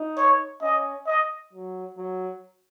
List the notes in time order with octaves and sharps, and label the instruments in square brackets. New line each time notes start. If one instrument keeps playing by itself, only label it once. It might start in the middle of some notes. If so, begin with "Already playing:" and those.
Already playing: [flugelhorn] D#4
[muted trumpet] C#5
[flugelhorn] C#4 [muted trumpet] D#5
[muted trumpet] D#5
[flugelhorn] F#3
F#3